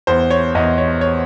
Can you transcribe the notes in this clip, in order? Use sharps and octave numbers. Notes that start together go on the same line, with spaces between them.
E2 C5
C#5
E2 D#5
C#5
C#5